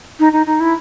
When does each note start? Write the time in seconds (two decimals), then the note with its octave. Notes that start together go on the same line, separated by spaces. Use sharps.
0.20 D#4
0.33 D#4
0.46 D#4
0.60 E4